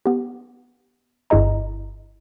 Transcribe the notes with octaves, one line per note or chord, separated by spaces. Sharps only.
B3 G4
G1 G2 E4 G#4 D#5 A#5